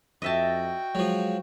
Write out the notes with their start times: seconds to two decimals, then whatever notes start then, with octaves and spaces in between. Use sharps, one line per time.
0.22 F2 F#4 D#5 E5 G5 A5
0.95 F3 F#3 G#3